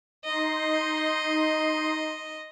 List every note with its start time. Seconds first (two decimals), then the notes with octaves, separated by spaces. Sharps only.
0.25 D#4 D#5 C6